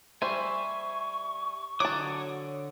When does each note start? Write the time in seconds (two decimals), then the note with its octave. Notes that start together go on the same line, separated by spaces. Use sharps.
0.22 G3 C5 E5 G#5 C#6
1.80 D3 F#3 C#5 A5 D6 D#6